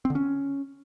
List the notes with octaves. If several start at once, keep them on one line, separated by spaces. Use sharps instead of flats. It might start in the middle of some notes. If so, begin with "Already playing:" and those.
C4
D3
C#4